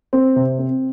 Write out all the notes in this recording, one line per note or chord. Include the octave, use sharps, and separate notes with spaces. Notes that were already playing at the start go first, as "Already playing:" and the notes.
C4
C3
C4